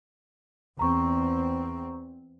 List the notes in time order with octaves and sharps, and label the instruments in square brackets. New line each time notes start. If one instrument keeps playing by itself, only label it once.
[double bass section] E2 C4 [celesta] A#5 C#6